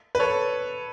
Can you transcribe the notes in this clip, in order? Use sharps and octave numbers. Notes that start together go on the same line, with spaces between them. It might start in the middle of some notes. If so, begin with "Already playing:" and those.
B4
A4 C#5